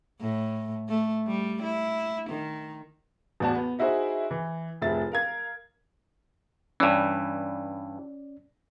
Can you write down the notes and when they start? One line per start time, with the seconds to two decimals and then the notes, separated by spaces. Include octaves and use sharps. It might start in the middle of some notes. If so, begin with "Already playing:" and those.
0.21 A2
0.89 A3
1.27 G3
1.63 E4
2.30 D#3
3.40 A1 E2 F#4 D5 A5
3.55 B3
3.79 D#4 E4 F#4 G#4 C5
4.31 E3
4.81 F1 A2 F3 G#4 E5 A6
5.12 A#4 F5 G#6
6.80 G2 E3 C#4 D5